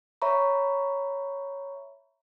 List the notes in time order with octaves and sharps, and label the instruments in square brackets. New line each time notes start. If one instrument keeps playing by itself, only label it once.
[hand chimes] C#5 E5 A#5 B5 C#6